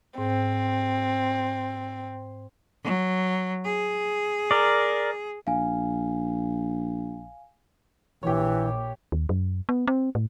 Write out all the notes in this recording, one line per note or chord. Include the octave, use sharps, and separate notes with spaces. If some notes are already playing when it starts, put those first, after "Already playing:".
G#2 C4
F#3
G#4
A#4 D5
A#1 F5 G#5
A#1 E3 G4 C#5
D#2
F#2
B3
C4
A2